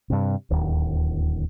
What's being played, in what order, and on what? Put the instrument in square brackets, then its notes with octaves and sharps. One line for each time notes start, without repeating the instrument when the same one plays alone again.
[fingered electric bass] G2 C3
D1 D#2